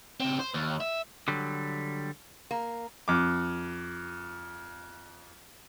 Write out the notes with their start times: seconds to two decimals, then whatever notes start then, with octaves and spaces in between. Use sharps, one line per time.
0.20 C#3 C4
0.39 C5
0.54 D#2
0.80 E5
1.28 D3 F#3 G3
2.51 A#3
3.08 F2 D6